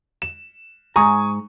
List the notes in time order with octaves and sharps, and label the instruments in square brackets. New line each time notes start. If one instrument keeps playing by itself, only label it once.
[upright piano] E7
[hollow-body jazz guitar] G#2 A#5 [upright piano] G#5 C#6 D#6